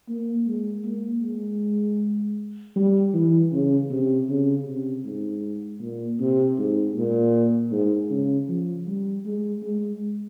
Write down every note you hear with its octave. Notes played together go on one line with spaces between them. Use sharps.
A#3
G#3
A#3
G#3
G3
E3
C#3
C3
C#3
C3
G#2
A#2
C3
G#2
A#2
G#2
C#3
F3
G3
G#3
G#3